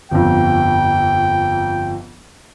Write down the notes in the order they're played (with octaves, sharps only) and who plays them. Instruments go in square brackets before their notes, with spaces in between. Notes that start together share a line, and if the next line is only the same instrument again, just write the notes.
[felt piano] G1 F2 [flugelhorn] G5